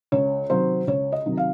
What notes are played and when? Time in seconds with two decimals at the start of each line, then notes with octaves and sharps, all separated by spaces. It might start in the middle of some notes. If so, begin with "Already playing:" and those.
0.12 C#2 C#5
0.50 C3 D#3 F#3 C5
0.87 C#2 C#5
1.12 D#5
1.26 C3 D#3 F#3
1.37 F5